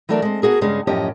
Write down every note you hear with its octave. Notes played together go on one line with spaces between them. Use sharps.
E3 F#3 A3 D4 A#4 D5
G#3 C4
B3 F#4 G#4 A#4
G2 C#3 G#3 C#4
F#2 A2 F3 C#4 G4 D#5